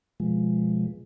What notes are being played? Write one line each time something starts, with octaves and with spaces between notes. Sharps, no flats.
B2 F3 G#3